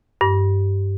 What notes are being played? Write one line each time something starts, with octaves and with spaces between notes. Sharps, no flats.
G2